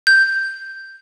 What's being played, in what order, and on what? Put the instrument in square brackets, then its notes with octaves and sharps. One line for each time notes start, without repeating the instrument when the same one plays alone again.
[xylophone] G6